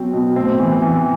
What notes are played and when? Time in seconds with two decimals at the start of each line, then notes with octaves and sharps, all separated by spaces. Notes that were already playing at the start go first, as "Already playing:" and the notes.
Already playing: B2 F#3 C4
0.13 B2
0.36 A2 C4
0.59 E3
0.82 E3